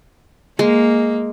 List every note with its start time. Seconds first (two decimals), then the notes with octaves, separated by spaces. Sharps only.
0.59 G#3 A#3